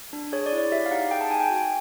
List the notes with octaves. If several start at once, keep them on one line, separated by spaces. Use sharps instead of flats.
D4
G#4 C#5
D5
E4
D5
G4 E5
F5
D#4 F#5
G#4 G5
A5
D#4 G#5
G5
F#4